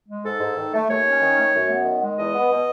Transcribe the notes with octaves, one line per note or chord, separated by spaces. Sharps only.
G#3
G#2 A4
G#2
D#3
A3
D#2 C#5
C#4
D#3
A3
F#2
B3
D#3
G#3
E2 D#5
B3
B2